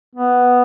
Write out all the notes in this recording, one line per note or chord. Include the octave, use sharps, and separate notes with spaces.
B3